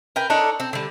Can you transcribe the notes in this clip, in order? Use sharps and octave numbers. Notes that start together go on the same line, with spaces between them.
A#4 B4 G5
D4 D#4 A4 C#5
C4
D3 G3